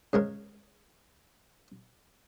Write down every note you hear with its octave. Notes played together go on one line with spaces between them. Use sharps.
C#3 G#3 A#4